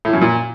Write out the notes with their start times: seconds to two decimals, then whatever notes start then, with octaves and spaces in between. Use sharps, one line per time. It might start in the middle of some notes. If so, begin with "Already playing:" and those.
0.05 A2
0.13 F#2
0.21 A#2